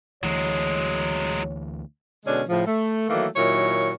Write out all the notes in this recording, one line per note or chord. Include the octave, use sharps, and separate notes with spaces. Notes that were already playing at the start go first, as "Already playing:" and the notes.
D2 E3 F#3 G#3 C#5
B2 D3 G#3 C#4 D4
A2 C#3 F3
A3
D#3 E3 F#3 A3 A#3
A#2 D#3 F#3 E4 C#5